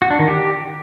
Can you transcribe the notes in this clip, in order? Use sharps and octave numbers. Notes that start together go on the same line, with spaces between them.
F#4
D4
D#3
G4